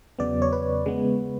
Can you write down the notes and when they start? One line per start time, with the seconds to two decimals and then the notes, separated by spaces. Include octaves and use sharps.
0.19 E2 C#3 F#3 B3 D5
0.42 C#5
0.53 B4
0.86 C#3 G#3 B3